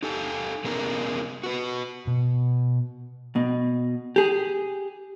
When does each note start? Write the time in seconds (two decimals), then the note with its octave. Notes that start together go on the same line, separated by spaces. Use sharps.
0.03 D#4 G4 A4 G#5
0.64 C3 B3 C#4 D#4 G#4 A#4
1.43 F#4 B4
2.07 B2
3.36 B2
4.16 G4 G#4